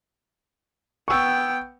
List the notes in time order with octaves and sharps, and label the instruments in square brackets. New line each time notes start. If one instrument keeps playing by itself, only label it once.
[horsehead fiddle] B3 G5 [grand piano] C#6 E6